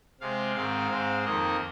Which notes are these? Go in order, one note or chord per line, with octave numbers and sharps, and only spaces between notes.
C3 G#3 C4 F5
G#2 D#3 C4 F5
G#2 G#3 C4
F2 D#3 A#3 D#5